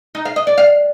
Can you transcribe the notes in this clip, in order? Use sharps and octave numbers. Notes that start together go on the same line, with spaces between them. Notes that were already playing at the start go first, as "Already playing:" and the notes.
D#4
F5
D#5
D5
F5